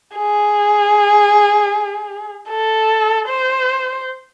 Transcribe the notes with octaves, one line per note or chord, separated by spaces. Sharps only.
G#4
A4
C5